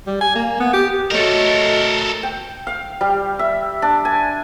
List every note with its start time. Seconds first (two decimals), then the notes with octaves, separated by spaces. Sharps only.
0.07 G3
0.21 G#5
0.35 A#3
0.60 B3
0.73 G4
1.11 A3 F#4 A4 A#4 C#5 D#5
2.23 G5
2.67 F5
3.01 G3
3.39 E5
3.82 D4
4.05 G#5